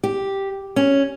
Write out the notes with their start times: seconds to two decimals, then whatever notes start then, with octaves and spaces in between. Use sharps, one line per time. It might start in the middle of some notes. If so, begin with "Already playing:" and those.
0.03 G4
0.76 C#4